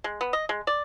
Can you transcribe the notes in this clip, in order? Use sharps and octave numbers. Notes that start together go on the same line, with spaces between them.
G#3
B3
D#5
G#3
D5